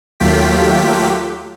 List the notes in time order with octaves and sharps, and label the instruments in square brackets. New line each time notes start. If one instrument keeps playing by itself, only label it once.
[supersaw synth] D#2 F#3 A3 F4 G4 B6